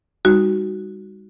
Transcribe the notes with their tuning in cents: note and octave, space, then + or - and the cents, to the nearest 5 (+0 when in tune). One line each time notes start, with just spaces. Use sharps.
G3 +40 D#4 +0 F#4 +0